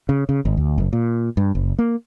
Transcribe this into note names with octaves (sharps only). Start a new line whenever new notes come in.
C#3
C#3
G#1
D2
F#1
A#2
G2
F#1
A#3